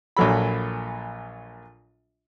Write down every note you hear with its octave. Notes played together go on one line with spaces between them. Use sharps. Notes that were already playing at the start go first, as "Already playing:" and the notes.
A#1 A#2 F#3 A4 B5